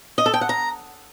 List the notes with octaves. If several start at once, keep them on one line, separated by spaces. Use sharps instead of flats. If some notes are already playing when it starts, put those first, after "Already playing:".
D#5
A4
G5
F#5
A#5